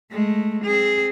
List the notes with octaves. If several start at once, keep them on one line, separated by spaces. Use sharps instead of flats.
G#3 A3
C4 G#4